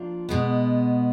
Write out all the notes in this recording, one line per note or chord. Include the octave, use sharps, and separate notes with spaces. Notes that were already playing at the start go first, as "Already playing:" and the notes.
Already playing: F3 A#3 D4 F4
B2 G#3 B3